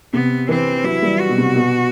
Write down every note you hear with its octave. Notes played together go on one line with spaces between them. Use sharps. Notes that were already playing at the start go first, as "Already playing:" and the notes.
C3 B3
E3 C4
F#3 E4
G3
F#4
B2
C3
B2